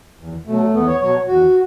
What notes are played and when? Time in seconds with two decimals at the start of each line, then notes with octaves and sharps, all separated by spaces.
0.19 E2
0.46 B2 F#3 A3
0.73 E2 B3
0.87 C#5
1.00 B2 F#3 C#5
1.27 E2 F#4